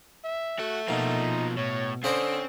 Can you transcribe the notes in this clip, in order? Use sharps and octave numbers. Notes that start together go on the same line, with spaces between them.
E5
A3 F#4
B2 F3 A#3 D#4
A2 C#5
D3 C4 C#4 C5 D5 D#5